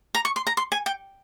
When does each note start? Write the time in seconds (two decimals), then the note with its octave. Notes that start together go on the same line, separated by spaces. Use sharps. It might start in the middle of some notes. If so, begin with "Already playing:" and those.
0.15 A#5
0.25 C#6
0.36 C6
0.47 A#5
0.57 C6
0.72 G#5
0.86 G5